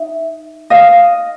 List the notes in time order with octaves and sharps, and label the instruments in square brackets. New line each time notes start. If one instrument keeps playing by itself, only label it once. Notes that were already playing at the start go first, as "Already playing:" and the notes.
Already playing: [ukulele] D#4 E5
D#5 F5